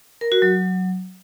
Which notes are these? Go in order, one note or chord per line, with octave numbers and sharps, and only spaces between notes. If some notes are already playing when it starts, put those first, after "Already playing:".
A#4
F#4
F#3